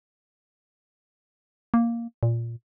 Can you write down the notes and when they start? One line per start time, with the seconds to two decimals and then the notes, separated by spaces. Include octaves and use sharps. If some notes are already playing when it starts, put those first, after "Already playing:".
1.74 A#3
2.23 A#2